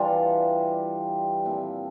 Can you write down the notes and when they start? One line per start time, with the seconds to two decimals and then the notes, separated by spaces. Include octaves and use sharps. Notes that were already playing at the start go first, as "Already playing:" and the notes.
Already playing: E3 G3 D4 F4
1.45 A#2 F3 C4 E4